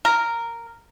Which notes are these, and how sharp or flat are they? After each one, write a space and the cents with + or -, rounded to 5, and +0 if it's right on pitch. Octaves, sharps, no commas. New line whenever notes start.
A#4 -5